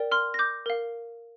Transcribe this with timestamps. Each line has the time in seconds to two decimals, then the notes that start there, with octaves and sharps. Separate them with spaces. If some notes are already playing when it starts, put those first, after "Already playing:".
Already playing: A#4 D5 G5
0.11 C6 F6
0.34 A#6
0.39 D6 G6
0.66 A#4 F5